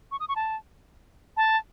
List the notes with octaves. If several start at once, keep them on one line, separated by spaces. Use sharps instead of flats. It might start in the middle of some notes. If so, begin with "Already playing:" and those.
C#6
D#6
C#6
A5
A5